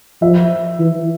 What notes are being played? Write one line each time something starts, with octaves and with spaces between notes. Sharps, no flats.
F3 E5
E3